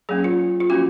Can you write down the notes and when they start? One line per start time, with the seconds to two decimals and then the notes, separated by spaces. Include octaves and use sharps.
0.09 F#3 A#3 C#4 G#4
0.24 F4
0.60 F4
0.70 F3 A#3 C#4 F#4